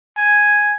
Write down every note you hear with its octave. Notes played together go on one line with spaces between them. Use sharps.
G#5